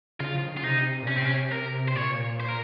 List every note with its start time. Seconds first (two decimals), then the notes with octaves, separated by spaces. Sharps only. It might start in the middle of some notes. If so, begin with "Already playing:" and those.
0.20 C#3 F4
0.34 F3
0.45 D#3
0.54 C#3 F4
0.63 C3 D#4
1.02 A#2
1.08 C3 C#4
1.17 C4
1.25 C#4
1.52 A#4
1.88 C5
1.95 A#2 C#5
2.40 C5
2.49 A#4